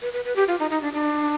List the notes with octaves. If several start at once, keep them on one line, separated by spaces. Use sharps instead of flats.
B4
B4
B4
G4
F4
D#4
D#4
D4
D4